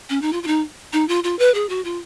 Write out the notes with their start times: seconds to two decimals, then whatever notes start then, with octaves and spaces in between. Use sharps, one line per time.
0.10 C#4
0.22 D#4
0.33 F4
0.43 F4
0.47 D#4
0.93 D#4
1.08 F4
1.24 F4
1.39 B4
1.54 G#4
1.69 F#4
1.85 F4